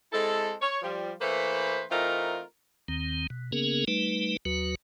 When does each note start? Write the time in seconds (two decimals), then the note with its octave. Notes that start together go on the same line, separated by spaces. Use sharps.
0.11 G#3 C4 E4 A4
0.60 C#5
0.81 F3 G3
1.20 E3 A3 A#3 B4 C5
1.89 E3 A3 C4 D#4 F4 A#4
2.88 D#2 D#3 C4
3.30 B2
3.52 C#3 A#3 B3 C#4 G#4 A#4
3.88 G3 A3 D#4 B4
4.45 D#2 F#3 F#4 B4